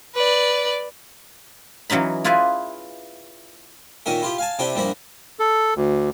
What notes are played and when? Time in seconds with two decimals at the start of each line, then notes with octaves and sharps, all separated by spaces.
0.14 B4 D5
1.90 E3 F#3 C#4 D#4 B5
2.24 E4 F4 G#4 B4 D5 E5
4.06 A#2 D#3 C#4 A#4 E5
4.22 E4 F4 G4
4.38 F5 G#5 A5
4.59 C3 D4 E4 G4 G5 A5
4.75 A#1 G2 F3 A#3 E4 B5
5.39 A4
5.76 D2